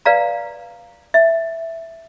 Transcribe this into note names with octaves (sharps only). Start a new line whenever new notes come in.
B4 D5 F5 A#5
E5